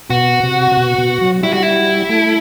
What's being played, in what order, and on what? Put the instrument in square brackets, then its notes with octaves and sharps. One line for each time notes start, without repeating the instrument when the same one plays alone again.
[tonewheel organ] B2 [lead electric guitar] F#4
[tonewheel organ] C3
C3
B2
B2
F#3
[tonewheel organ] G3 [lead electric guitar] E4
[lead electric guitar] F#4
E4
[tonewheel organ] A3